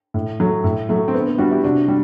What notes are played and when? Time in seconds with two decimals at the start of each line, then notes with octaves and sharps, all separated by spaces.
0.14 A2
0.40 F#3 A3
0.64 A2
0.89 F#3 A3
1.08 C4
1.14 D3 B3
1.27 B3
1.38 G3 D4 F#4
1.51 E4 G4
1.63 C3 D4 F#4
1.88 G3